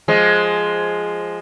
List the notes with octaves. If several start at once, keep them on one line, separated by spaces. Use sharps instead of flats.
F3 G#3